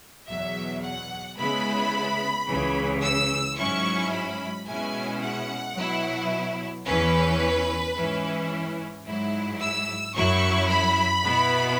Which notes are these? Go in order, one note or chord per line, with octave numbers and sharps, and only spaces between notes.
E2 B2 F#3 E5
F#5
C#3 G#3 B3 E4 B5
C#2 C#3 E3
E6
G#2 F#3 C#4 E4 C#6
B5
B2 G#3 C#4 E4 G#5
F#5
B2 F#3 E4
E2 E3 C#4 B4
G#2 E3 C#4 E4
G#2 F#3 E4
E6
F#2 F#3 E4 C#6
B5
B2 B3 E4